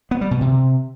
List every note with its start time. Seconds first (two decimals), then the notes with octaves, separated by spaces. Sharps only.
0.11 B3
0.21 G3
0.31 B2
0.41 C3